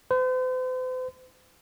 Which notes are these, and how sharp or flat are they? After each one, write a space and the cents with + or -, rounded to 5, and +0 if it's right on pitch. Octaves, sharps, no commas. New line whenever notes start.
C5 -45